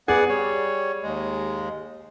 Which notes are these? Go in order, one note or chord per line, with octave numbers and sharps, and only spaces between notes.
B3 G#4 D5 F#5
G3 C#5
D#2 G#3